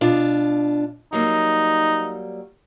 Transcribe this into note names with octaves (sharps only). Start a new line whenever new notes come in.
B2 D4 F4
F#3 G3 A#3 D#4